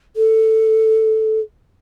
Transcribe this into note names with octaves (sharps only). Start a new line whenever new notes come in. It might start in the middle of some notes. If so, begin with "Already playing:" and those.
A4